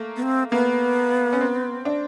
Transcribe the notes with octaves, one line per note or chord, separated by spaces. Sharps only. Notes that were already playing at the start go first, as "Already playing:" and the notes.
Already playing: A3 A#3
B3
C4
A#3 B3
C#4
C4
D4